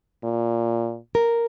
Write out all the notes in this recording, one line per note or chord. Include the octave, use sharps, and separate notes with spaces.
A#2
A#4